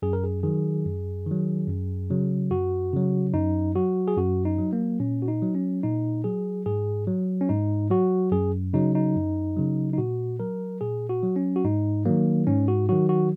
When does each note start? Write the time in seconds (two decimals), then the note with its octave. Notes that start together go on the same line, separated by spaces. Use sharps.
0.02 F#2 G#4
0.13 A#4
0.24 G#4
0.43 D#3 F#3 G#4
0.85 F#2
1.26 D#3 F#3
1.68 F#2
2.10 C#3 F#3
2.51 F#2 F#4
2.93 C#3 F#3
3.34 F#2 D#4
3.75 F#3 F#4
4.08 G#4
4.17 F#2 F#4
4.45 D#4
4.58 F#3
4.73 A#3
5.00 A#2 C#4
5.22 F#4
5.28 D#4
5.42 F#3
5.55 C#4
5.83 A#2 D#4
6.24 F#3 G#4
6.66 G#2 G#4
7.07 F#3
7.41 C#4
7.49 G#2 D#4
7.91 F#3 F#4
8.32 F#2 G#4
8.73 C#3 F#3 D#4
8.95 D#4
9.16 F#2
9.56 C#3 F#3
9.93 D#4
9.98 A#2 F#4
10.40 F#3 A#4
10.81 A#2 G#4
11.09 F#4
11.23 F#3
11.36 C#4
11.56 F#4
11.65 G#2 D#4
12.05 D#3 F#3 A#3
12.47 G#2 C#4
12.68 F#4
12.89 D#3 F#3 F#4
13.09 F#4